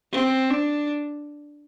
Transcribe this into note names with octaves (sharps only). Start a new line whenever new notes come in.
C4
D4